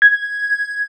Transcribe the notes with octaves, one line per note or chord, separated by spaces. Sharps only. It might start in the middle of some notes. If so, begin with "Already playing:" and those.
G#6